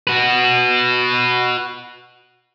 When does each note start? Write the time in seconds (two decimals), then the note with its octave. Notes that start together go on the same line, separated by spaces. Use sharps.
0.07 F#4 B4